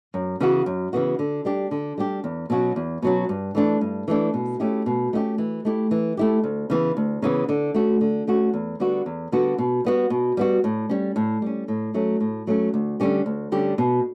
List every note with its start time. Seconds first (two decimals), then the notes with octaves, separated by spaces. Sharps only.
0.14 F#2
0.40 C#3 E3 B3 F#4
0.66 F#2
0.93 C#3 E3 B3 F#4
1.19 D3
1.45 G3 D4 G4
1.71 D3
1.98 G3 D4 G4
2.24 E2
2.50 B2 F#3 C#4 F#4
2.76 E2
3.02 B2 F#3 C#4 F#4
3.29 G2
3.55 E3 A3 D4
3.81 G2
4.08 E3 A3 D4
4.34 B2
4.60 A3 C#4 E4 G4
4.86 B2
5.13 A3 C#4 E4 G4
5.38 E3
5.65 A3 E4 G4
5.91 E3
6.17 A3 E4 G4
6.44 D2
6.70 C#3 E3 B3
6.97 D2
7.22 C#3 E3 B3
7.49 D3
7.74 A3 C#4 F#4
8.01 D3
8.27 A3 C#4 F#4
8.53 E2
8.80 D3 G3 B3 F#4
9.06 E2
9.32 D3 G3 B3 F#4
9.58 B2
9.85 G3 B3 F#4
10.10 B2
10.37 G3 B3 F#4
10.64 A2
10.89 G3 C#4
11.16 A2
11.42 G3 C#4
11.68 A2
11.94 F#3 A3 C#4
12.20 A2
12.47 F#3 A3 C#4
12.74 D2
13.00 D3 G3 C#4 G4
13.26 D2
13.52 D3 G3 C#4 G4
13.78 B2